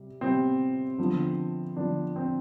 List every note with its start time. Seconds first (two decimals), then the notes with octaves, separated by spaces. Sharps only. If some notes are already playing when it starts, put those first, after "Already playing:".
Already playing: C3 G3
0.21 C3 G3 B3 C4
0.98 D3 F3 B3
1.76 D3 F3 B3 D4
2.16 C4